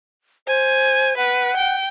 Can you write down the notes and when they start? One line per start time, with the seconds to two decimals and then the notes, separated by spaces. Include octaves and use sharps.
0.47 C5 G#5
1.17 B4 F#5
1.57 G5